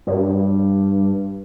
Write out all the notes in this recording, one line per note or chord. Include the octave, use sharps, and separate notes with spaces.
G2